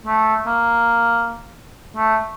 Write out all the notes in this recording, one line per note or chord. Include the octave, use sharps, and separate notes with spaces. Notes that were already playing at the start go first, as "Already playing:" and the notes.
A3
A#3
A3